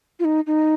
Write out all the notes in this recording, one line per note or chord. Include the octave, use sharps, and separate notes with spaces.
F4
D#4
D#4